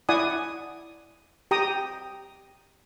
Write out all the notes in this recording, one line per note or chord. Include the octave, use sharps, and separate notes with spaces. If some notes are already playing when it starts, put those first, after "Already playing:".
E4 D5 F#5 G#5 D#6
G4 G5 A#5 D#6